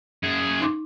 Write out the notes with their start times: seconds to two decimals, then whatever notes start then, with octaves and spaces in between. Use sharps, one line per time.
0.23 F#2 G#4 G#6
0.61 D#4 C6 D6